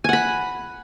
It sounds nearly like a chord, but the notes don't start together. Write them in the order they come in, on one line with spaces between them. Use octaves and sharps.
G#5 F#5 B5